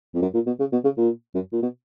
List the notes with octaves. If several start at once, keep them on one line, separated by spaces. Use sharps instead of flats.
F2
F#2
A#2
B2
C#3
B2
C#3
A#2
F#2
A#2
B2